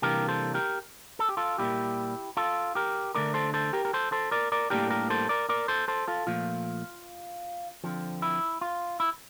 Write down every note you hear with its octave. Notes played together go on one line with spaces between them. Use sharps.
C3 E3 G3 A#3 D4 G4 A#4
A4 C5
G4 A#4
A4
G4
F4 A4
A#2 G3 A#3 E4 G4
F4 A4
G4 A#4
D3 A3 D4 A#4 D5
A4 C5
A4 C5
G4 A#4
A#4
A4 C5
A4 C5
A#4 D5
A#4 D5
A2 G3 A#3 D4 G4 A#4
G4 A#4
A4 C5
A#4 D5
A#4 D5
A4 C5
A4 C5
F4 A4
A#2 F3 A3 F4
D3 F3 C4
E4
F4
E4